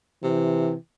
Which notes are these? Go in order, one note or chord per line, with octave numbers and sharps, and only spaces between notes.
C3 E3